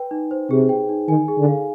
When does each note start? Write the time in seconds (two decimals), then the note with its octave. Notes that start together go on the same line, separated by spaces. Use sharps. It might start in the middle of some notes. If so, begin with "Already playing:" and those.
Already playing: B4 G5
0.11 D#4
0.31 C5
0.50 C3 G#4
0.69 G5
0.89 D#4
1.08 D#3 G#5
1.28 G#4
1.38 D3
1.48 F5